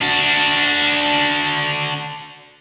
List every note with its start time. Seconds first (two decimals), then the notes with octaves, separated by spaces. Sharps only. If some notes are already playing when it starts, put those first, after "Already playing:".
0.02 D4 F#4